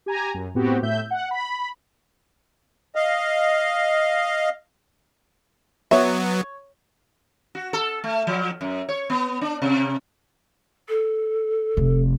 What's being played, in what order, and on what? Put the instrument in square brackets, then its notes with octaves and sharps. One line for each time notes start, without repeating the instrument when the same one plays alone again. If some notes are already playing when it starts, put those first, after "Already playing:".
[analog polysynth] G4 G#5 A#5
F#2
A2 B3 C4 F#4 G4
A2 E5 G6
F#5
B5
[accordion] D#5 F5
[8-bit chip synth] F#3 B3 [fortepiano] C#5 [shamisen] E5
[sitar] F#4
A4
A3
F3
F#2
C#5
B3
D4
C3
[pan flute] A4
[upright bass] F1